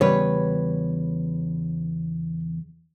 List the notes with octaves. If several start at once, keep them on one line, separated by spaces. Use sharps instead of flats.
E2 C#3 G3 B4 C#5